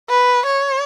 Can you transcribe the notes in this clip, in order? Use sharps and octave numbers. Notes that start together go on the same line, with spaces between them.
B4
C#5